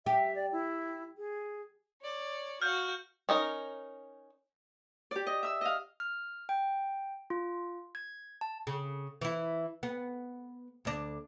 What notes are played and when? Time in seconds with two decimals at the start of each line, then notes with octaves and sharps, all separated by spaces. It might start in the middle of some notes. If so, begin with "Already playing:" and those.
0.06 G4 E5
0.35 D5
0.52 E4
1.18 G#4
2.02 C#5 D5
2.62 F#4 F5 F6 G6
3.29 C#4 D#4 A#4
5.11 G4 D5
5.27 D#5
5.43 E5 E6
5.61 D#5 F5
6.00 F6
6.49 G5
7.30 F4
7.95 G#6
8.41 A5
8.67 C#3
9.21 E3 E4
9.83 B3
10.85 D2 D4